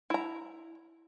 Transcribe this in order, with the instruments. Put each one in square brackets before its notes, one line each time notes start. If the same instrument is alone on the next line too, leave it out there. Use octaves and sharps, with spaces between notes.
[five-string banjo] E4 A#5